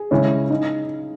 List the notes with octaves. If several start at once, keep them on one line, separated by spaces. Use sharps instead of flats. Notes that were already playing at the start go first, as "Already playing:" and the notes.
Already playing: G#4
C#3 G#3 C#4 E4
D#4